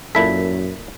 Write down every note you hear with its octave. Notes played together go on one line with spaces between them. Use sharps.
F#2 A#2 E4 A4 B6